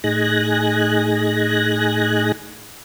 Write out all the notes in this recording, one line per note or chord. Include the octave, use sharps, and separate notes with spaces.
A2 D#4 G#4 G#5 F#6 A#6